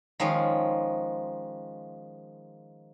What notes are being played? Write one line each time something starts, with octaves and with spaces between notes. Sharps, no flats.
D#3 F3 G#3 C#4